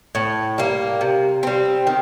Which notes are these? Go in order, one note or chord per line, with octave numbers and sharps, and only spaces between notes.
A2
G3 A#3
C3
G3 C4
D#3